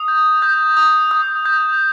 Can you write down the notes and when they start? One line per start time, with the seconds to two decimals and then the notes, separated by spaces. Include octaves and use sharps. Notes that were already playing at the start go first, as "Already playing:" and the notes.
Already playing: D#6
0.08 G6
0.42 G6
0.77 D#6
1.11 D#6
1.46 G6